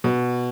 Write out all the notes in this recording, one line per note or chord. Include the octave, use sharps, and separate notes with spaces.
B2